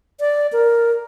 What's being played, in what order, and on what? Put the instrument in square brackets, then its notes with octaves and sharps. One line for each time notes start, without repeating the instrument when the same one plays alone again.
[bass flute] D5
A#4